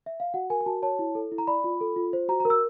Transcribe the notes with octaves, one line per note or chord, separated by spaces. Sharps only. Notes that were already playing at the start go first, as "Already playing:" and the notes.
E5
F5
F#4 F#5
A#4 G#5
G#5
F#4 A5
C#5 A5
E4
A4
E4
A#5
D5 B5
F4
A4
F4
C5
F#4 A#5
A#5
A#4
E6